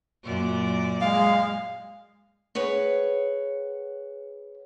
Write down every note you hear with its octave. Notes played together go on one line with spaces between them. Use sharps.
F#2 A#2 D5
G#3 F5
G#4 B4 C#5 F#5